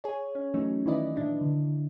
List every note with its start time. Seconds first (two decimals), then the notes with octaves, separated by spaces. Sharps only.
0.04 G#4 C#5
0.35 C#4
0.54 E3 F#3 A3 C#4 D#4
0.86 D#3 E3 E4 B4 D5 D#5
1.16 A#2 D4 E4
1.41 D3